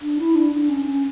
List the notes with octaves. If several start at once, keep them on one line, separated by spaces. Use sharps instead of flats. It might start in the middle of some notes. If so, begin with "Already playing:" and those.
D4
E4
D4
D4
C#4
D4
C#4